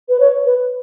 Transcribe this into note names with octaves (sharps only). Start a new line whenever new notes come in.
B4
C#5
B4